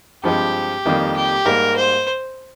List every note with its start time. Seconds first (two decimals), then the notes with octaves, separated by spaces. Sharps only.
0.24 G2 F3 G#3 C4 G4
0.85 F2 D#3 G3 A#3
1.16 G4
1.45 G#2 G3 A#3 A#4
1.76 C5